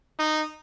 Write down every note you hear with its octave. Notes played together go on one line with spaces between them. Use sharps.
D#4